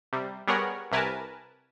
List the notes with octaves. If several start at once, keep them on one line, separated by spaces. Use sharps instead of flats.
C3 G3
G3 B3 G#4 A#4 C#5 F#5
C2 C3 A#4 B4 G#5 A5